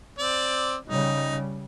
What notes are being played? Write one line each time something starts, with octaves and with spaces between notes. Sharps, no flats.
C4 D5
C#3 G3 D#4